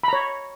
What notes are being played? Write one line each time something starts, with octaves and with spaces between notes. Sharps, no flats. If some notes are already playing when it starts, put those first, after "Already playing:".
C#5 A#5 B5